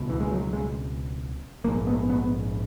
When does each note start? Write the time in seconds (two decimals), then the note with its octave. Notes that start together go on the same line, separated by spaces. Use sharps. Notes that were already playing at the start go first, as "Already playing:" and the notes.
Already playing: C#2 B2
0.10 E3
0.20 G#3
0.31 F#3
0.53 G#3
1.64 A#1 G#2 A#3
1.87 B3
2.09 B3